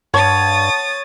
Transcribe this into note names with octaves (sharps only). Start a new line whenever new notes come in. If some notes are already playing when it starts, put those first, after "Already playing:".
G2 C#5 F#5 A5 D#6 A6